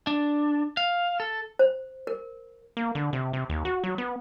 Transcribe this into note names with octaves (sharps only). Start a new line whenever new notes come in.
D4
F5
A4
C5
A#4
A#3
D3
C3
C3
D#2
F#4
F#3
B3